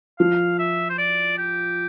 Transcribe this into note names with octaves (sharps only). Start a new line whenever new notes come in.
F3 F5
E5
C5
D5
G4